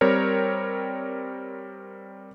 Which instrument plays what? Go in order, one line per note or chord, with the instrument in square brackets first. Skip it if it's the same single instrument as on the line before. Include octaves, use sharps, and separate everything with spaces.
[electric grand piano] G3 C4 A#4 C#5